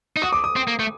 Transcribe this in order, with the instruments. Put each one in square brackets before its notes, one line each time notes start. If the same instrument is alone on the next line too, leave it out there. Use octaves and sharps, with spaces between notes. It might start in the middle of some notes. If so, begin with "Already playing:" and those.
[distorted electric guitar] D#4
[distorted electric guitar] F#4 [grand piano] D#6
[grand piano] D6
D#6
[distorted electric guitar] C4
A#3
A3